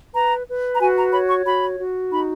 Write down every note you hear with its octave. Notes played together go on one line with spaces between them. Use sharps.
B4 A#5
B4
A#5
F#4 G#5
A#5
C#5 B5
C#6
F#4 B5
F#4
D#4 B5